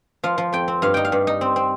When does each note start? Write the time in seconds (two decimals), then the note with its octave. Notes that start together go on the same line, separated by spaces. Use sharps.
0.24 F3 F5
0.38 F3
0.53 F2 G5
0.68 C4
0.82 G2 F5
0.94 D#4 G5
1.05 F5
1.12 G2
1.27 D#4
1.41 C4
1.56 C4